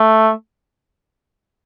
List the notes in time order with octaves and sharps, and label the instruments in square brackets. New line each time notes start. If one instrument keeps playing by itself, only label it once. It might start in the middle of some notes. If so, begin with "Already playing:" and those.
Already playing: [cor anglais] A3